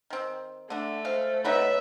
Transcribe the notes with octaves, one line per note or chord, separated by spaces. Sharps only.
D#3 C4
D3 A3 D4
G#3 C5 F5
D#4 F#4 B4 C#5 E5 B5